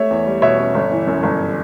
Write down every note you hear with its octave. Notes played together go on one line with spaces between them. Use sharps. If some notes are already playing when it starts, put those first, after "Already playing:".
Already playing: A3 C#5 E5
E2
G3
B2 C#5 E5
C#4
G1
E3
F#2
G1